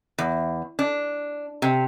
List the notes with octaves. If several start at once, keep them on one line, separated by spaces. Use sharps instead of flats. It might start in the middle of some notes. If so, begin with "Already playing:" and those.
E2
D4
C3